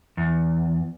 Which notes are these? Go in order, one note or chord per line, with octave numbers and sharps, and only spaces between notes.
E2